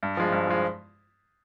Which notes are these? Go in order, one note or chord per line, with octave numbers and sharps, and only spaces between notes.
G2
F3 G#3
G2
F3 G#3